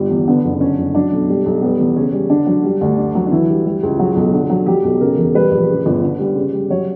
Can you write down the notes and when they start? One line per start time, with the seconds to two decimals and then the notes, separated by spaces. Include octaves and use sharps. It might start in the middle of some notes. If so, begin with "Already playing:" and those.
Already playing: G1 G3
0.10 E2
0.28 D3 B3
0.44 F#1
0.53 B3
0.61 D3 C#4
0.78 F#1
0.94 F#3 D4
1.12 B1
1.29 G3
1.46 B1
1.62 G3 B3
1.79 E2
1.96 C#3 C#4
2.13 G3
2.30 D3 D4
2.46 F#3
2.64 G3
2.81 D2
2.97 D3 D4
3.15 F#3
3.26 D4
3.32 E3 E4
3.49 G3
3.65 G3
3.83 C#2
3.99 F#3 F#4
4.16 B1
4.33 D3
4.50 F#3
4.66 F#3 G4
4.84 B1
5.01 C#3 A#4
5.18 E1
5.35 G3 B4
5.51 A#1
5.68 C#3
5.86 G1
6.02 D3
6.19 G3
6.36 C#3
6.53 G3
6.70 F#3 C#5